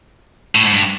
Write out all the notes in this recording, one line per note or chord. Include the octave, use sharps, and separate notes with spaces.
A2
G#2
G2